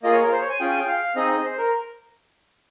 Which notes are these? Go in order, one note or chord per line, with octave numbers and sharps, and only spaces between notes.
A#3 F4 G#4 D#5
C#5
A#4
C5
C#5
G#5
C#4 F4 G#4 G5
G#5
G5
F5
C4 D#4 G#4 D#5
C5
A#4